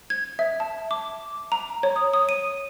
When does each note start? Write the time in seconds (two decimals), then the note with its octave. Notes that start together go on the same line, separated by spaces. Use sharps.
0.10 G#6
0.39 E5
0.60 A5
0.91 D6
1.52 A#5
1.83 C#5
1.96 D#6
2.14 D#6
2.29 D#7